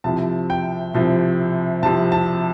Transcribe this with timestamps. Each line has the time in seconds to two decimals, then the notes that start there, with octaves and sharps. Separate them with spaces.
0.04 C2 C3 F3 A5
0.50 G5
0.94 C2 C3 F3
1.82 C2 C3 F3 A5
2.12 A5